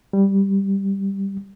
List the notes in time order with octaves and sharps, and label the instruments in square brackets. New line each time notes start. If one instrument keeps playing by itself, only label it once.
[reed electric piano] G3